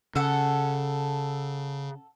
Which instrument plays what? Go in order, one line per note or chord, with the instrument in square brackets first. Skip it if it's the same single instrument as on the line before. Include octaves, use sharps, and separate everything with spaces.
[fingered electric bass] C#3 [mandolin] A4 F#5